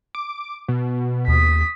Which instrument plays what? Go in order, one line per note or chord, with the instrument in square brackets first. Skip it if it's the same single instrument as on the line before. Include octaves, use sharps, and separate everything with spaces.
[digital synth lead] D6
B2
[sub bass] D#2 [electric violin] D#6 B6